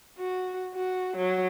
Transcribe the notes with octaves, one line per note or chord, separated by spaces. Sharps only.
F#4
F#4
F#3